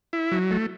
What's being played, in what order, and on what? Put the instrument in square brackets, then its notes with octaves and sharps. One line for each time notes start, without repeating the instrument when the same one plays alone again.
[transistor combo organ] E4
F#3
A3